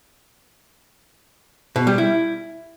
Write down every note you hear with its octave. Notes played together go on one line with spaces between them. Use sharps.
B2
G3
E4